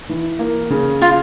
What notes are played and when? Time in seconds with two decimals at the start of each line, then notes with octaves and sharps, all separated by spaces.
0.09 E3
0.39 A#3
0.70 C#3
1.02 F4